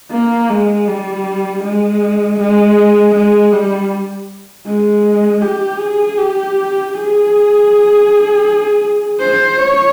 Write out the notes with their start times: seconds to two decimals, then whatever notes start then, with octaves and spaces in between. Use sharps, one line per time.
0.11 A#3
0.50 G#3
0.88 G3
1.63 G#3
2.39 G#3
3.15 G#3
3.52 G3
4.66 G#3
5.42 G4
5.80 G#4
6.18 G4
6.94 G#4
9.20 C5
9.59 C#5